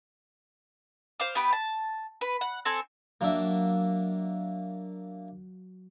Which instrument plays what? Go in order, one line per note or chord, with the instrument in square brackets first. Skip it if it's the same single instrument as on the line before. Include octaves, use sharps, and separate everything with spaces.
[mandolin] C5 F5 D6
B3 G4 B4
A5
B4
F#5
C4 A4 G#5
[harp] F#3 F#4 [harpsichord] A#3 D4 E5